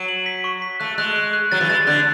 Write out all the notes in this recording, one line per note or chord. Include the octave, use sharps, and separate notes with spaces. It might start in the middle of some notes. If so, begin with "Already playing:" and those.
Already playing: F#3
F#7
B6
C#6
B6
A3 F#6
G#3 F#6
F#6
F#6
F#3 A6
E3
G#3 A6
D3 F#6